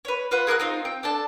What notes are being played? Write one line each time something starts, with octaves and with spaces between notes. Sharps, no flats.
B4 C#5
F4 B4 F#5
G#4 A#4 E6 F#6
C4 D#4 F4
C4 G5
D4 A4 A5